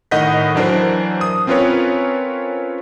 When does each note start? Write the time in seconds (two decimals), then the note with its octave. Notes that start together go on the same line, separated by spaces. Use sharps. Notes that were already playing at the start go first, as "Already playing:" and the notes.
0.11 A2 D#3 D#5 F#5 G6 B6
0.55 E3 F#3 D4 A#4 C5
1.21 D#6
1.47 C4 C#4 F4 A#4 B4 C#5